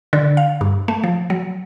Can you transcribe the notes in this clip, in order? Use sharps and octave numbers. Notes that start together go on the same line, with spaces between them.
D3
F5
G2
A3
F3
F#3